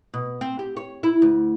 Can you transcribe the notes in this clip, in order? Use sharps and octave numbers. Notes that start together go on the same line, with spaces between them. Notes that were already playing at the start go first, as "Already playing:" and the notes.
B2
C4
G4
C#5
E4
D2